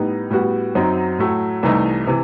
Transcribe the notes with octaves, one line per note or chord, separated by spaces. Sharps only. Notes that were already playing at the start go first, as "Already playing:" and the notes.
Already playing: A2 G3 B3 D#4
A2 G3 B3 F#4
F#2 F#3 C4 D#4
A2 F#3 A3
C2 C3 E3 A3 D#4
C3 E3